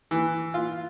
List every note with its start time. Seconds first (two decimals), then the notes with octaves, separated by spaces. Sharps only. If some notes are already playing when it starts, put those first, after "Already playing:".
0.11 E3
0.54 F4